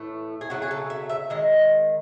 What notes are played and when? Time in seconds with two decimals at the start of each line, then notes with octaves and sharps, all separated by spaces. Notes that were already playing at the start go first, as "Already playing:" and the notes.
Already playing: A2 E3 A3
0.41 G#4
0.50 C#3 F#3 A3 F#4
0.62 G#4
0.71 A4
0.90 E5
1.10 E5
1.30 D#3 G#3 D#5